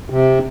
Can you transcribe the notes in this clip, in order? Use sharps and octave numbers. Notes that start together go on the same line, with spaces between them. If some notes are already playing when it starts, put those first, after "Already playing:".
C3